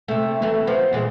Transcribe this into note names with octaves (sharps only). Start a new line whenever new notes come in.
C3 A3
E3 F#3 A3
F3 B3
A#2 E3 G#3